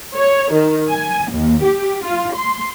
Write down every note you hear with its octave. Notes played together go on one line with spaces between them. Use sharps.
C#5
D#3
G#5
D#2
G4
F4
C6